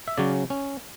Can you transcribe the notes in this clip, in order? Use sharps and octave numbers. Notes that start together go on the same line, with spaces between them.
E5
C#3 F#3 C#4 D5
C#4